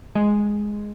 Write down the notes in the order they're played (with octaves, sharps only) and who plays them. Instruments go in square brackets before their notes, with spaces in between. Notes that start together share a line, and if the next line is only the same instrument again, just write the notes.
[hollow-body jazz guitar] G#3 G#4 D#5